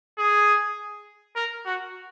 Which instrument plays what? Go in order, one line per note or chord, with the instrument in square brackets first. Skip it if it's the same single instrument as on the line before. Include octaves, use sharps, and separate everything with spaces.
[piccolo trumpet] G#4
A#4
F#4